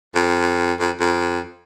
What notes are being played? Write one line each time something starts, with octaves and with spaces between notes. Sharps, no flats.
F2
F2
F2